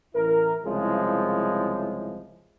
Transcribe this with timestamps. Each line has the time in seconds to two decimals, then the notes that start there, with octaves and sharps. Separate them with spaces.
0.14 A1 E4 A#4
0.65 C2 C#3 F3 G#3 E4